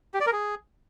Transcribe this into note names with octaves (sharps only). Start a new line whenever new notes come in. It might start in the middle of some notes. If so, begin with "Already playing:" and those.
G4
D5
A#4
G#4